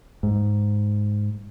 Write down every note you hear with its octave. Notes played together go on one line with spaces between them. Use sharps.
G#2